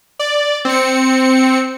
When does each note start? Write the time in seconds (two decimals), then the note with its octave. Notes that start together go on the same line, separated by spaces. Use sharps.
0.19 D5
0.65 C4 C#7